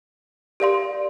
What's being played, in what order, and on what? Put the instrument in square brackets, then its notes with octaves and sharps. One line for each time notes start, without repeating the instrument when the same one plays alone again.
[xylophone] G4 A#4 D5 F5 C6